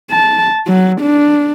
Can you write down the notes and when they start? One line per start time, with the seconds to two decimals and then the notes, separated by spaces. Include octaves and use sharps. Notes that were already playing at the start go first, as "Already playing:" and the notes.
0.11 A5
0.67 F#3
1.01 D4